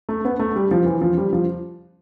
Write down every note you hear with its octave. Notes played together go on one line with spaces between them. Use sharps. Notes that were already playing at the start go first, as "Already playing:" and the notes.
A3
B3
A3
G3
F3
E3
F3
G3
F3